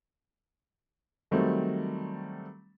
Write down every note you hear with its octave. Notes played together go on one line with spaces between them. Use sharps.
D#3 F#3 G3 A3 C4